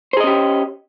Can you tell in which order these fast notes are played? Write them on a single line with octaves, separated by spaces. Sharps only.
C5 G#4 D#5 C#4 G4